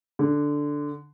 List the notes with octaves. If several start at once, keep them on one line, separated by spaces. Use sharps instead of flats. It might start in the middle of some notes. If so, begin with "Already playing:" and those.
D3